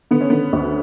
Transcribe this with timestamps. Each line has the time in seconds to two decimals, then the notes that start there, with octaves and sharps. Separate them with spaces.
0.11 D3 B3
0.21 C#4
0.30 D3 B3
0.53 D2